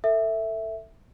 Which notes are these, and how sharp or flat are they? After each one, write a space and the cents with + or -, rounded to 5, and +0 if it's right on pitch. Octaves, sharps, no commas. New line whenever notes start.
A4 +25 E5 +0